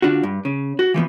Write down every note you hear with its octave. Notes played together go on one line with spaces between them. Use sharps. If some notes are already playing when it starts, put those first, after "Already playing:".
D3 D4 F4 F#4
G2
C#3
F#4
E3 F3 A3 B3